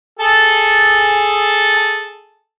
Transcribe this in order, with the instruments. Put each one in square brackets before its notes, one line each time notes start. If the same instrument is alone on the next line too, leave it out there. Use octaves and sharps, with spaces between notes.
[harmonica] G#4 A4 A5